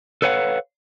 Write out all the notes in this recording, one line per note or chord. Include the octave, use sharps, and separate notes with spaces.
A4 B4 C#5 F5 F#5